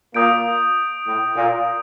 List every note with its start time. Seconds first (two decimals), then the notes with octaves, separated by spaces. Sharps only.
0.14 A#2 A#3 D#6 G6 D7
1.06 A2
1.36 A#2